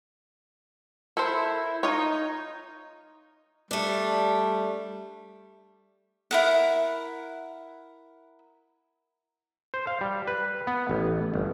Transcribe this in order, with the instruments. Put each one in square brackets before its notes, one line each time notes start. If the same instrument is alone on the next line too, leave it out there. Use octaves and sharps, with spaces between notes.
[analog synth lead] E4 [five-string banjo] A4 A#4 C5
[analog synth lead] D#4 [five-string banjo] F4 C#5
[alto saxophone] G3 [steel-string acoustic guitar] A3 D4
[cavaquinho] E4 A#4 F#5
[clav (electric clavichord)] C5
F5
G3
B4
B3
A1
G1